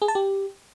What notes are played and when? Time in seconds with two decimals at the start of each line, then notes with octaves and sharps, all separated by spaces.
0.02 G#4
0.08 A5
0.15 G4